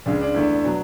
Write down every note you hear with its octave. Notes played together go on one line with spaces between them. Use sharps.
C#2 C#3 G#3 D4
D4
E2 D3 A3
B2 F#3